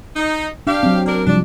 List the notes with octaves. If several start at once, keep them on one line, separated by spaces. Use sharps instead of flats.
D#4
D4 G4 F5
F#3 C4
A#3 D4 A#4
C3 F3 G3 D4